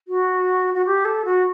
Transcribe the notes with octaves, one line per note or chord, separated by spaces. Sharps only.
F#4
F#4
G4
A4
F#4